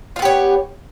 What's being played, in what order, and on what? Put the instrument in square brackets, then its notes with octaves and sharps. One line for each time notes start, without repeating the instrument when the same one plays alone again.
[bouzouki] F4
B3
G4
C#5